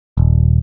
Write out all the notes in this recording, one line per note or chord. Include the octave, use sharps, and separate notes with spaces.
D#1